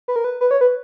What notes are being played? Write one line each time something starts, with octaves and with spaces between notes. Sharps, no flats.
B4
A#4
B4
B4
C#5
B4